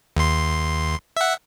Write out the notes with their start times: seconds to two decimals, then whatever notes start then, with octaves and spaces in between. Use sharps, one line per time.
0.16 D#2 C6
1.17 E5 F#5